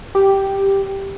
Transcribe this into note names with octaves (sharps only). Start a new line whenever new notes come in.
G4